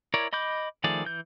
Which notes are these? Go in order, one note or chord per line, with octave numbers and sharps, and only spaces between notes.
E4 A#4 C#5 D5
D#5 B5 D6 G6
D#3 F3 A3 G#4 D5
E3 G6